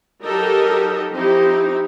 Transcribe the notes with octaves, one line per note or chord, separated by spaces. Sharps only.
F#3 D#4 G4 A4 A#4 D#5
F3 C4 D#4 E4 G4